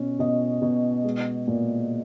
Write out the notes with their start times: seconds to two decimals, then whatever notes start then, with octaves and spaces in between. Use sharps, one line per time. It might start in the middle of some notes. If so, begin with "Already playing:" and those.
Already playing: B2 C#4
0.19 B2 D#5
0.62 B2
1.04 G#3
1.47 A#2